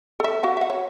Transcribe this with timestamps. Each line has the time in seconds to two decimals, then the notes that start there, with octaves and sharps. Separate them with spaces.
0.20 A4 E5
0.43 F#4 F5 F#5
0.57 E5 F#5
0.70 C#5